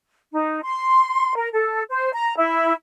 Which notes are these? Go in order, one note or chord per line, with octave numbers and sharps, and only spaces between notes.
D#4
C6
A#4
A4
C5
A#5
E4